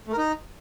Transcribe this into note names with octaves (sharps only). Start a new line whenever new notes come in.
A3
A#4
D#4